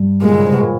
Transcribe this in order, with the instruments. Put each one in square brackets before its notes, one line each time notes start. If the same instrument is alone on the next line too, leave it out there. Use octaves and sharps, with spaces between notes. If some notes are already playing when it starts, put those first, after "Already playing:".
Already playing: [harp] G2
[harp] A#2 [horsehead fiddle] G#3
[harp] D3
C#3
C3
B2
A#2